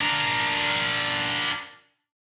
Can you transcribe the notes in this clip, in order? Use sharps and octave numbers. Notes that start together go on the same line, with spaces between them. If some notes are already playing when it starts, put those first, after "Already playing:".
D4 A#4